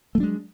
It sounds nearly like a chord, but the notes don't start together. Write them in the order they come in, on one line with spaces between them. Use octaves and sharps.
A3 F#3 D4 G#3